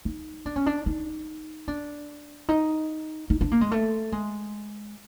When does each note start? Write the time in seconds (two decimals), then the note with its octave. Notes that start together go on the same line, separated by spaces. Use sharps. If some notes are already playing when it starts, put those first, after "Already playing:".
0.05 D#4
0.46 D4
0.56 C#4
0.66 D4
0.86 D#4
1.68 D4
2.49 D#4
3.30 D#4
3.41 D4
3.51 A#3
3.61 G#3
3.71 A3
4.12 G#3